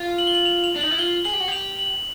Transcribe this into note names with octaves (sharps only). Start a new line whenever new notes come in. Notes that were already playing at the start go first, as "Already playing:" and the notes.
Already playing: F4
F#7
G7
F#7
F7
F7
D4
D#4 F#7
E4
F4 G7
G#4 F#7
G4
F#4
G4 F7
F#7